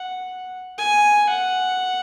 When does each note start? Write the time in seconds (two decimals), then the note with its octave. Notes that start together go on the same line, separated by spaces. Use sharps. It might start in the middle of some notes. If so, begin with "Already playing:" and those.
Already playing: F#5
0.78 G#5
1.29 F#5